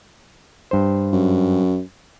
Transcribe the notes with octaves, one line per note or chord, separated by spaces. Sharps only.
G2 C5
F#2